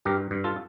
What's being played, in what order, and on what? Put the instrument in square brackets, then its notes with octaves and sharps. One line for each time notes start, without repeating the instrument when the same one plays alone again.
[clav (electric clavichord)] G2 G4 A#4
G2
F4 A4